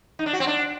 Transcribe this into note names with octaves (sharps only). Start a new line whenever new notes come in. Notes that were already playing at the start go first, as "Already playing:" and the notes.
D#4
D4
F#4
C4
D4